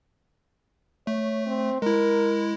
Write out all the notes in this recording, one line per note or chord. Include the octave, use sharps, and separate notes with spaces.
A3 C#5
C4
G#3 E4 A#4